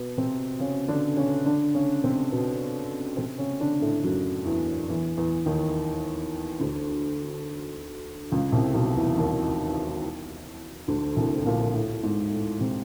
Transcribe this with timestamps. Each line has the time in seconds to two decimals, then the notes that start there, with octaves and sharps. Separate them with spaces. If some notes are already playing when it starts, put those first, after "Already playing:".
Already playing: B2 B3
0.17 C3 C4
0.60 C#3 C#4
0.88 D3 D4
1.17 C#3 C#4
1.45 D3 D4
1.74 C#3 C#4
2.04 C3 C4
2.32 B2 B3
3.17 C3 C4
3.38 C#3 C#4
3.60 D3 D4
3.81 A2 A3
4.03 F#2 F#3
4.45 E2 E3
4.89 E2 E3
5.17 E2 E3
5.46 D#2 D#3
6.60 D2 D3
8.32 C#2 C#3
8.52 C2 C3
8.74 B1 B2
8.96 E2 E3
9.17 D#2 D#3
10.88 D2 D3
11.17 C2 C3
11.38 A2
11.46 A#1 A#2
11.74 A2
12.03 G#2
12.32 A2
12.61 C3